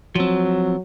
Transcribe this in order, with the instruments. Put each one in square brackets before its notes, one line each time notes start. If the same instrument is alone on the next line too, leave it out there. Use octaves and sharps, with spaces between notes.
[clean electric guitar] F3 C4 [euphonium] F#3